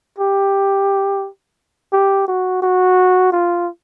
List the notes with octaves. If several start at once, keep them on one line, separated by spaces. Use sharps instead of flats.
G4
G4
F#4
F#4
F4